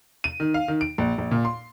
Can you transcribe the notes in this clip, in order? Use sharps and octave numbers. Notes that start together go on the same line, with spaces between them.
D#7
D#3
F5
D#3
D7
A#1
A#1
A#2
C6